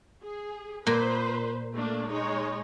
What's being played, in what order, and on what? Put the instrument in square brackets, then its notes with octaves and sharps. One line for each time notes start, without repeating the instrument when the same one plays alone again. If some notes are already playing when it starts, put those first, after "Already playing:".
[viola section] G#4
[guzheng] A#2 [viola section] B4 C5
[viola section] A3 A#3 D4
G#3 D#4 C#5